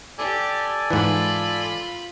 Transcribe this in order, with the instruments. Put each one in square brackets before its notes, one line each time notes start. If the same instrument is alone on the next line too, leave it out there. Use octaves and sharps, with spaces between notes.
[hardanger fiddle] G4 [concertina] A4 D5 G#5
[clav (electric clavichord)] G#2 E3 [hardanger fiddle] F4 B5